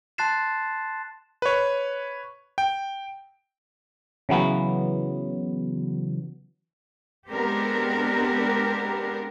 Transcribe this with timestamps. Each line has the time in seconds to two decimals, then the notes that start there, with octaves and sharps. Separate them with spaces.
0.18 A5 C6 F#6 A6 C7 E7
1.42 B4 C#5
2.58 G5
4.29 C#3 E3 F#3 B3
7.29 G#3 B3 C4 D4 G4 A#4